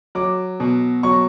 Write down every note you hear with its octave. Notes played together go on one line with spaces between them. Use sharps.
F#3 D6
B2
F#3 C#6